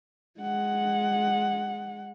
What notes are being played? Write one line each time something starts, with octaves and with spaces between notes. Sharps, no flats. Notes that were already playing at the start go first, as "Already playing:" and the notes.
G#3 F#5